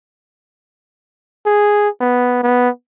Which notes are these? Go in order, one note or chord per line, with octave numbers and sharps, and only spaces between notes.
G#4
B3
B3